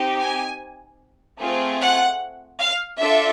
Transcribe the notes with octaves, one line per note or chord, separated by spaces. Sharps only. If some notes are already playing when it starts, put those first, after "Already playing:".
Already playing: C4 D#4 G4
G#5
A3 C4 F4 G#4
F#5
F5
D4 F4 A4 E5